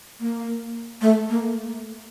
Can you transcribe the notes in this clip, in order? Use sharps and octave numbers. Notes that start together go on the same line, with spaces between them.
A#3
A3
A#3